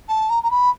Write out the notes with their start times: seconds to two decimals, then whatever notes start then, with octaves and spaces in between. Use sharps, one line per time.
0.08 A5
0.29 A#5
0.43 A#5
0.50 B5